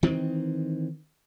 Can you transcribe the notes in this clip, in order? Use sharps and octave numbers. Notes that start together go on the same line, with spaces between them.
D#3 E3 C4